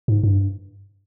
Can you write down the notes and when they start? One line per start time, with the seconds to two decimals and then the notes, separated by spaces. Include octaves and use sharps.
0.08 G#2
0.23 G2